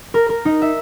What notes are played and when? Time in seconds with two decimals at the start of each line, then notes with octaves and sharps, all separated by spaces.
0.14 A#4
0.29 A#4
0.45 D#4
0.62 E5